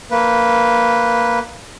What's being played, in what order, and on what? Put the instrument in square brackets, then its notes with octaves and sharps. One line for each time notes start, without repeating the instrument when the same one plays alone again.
[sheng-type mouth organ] A#3 B4